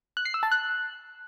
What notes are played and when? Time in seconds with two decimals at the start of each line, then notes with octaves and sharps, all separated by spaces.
0.17 F#6
0.25 C7
0.34 E6
0.43 A5
0.52 F#6